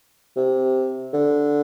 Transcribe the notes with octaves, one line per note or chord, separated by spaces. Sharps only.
C3
D3